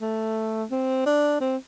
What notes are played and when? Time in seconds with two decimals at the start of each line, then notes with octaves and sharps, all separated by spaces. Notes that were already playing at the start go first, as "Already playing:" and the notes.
0.02 A3
0.71 C4
1.06 D4
1.41 C4